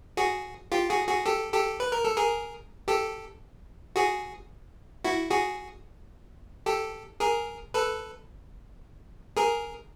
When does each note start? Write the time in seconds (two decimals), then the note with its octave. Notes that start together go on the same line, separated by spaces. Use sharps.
0.17 F#4 G#4
0.72 F4 G4
0.90 F#4 G#4
1.08 F#4 G#4
1.26 G4 A4
1.53 G4 A4
1.80 B4
1.92 A#4
2.05 A4
2.17 G#4 A#4
2.88 G4 A4
3.96 F#4 G#4
5.05 E4 F#4
5.31 F#4 G#4
6.66 G4 A4
7.20 G#4 A#4
7.74 A4 B4
9.37 G#4 A#4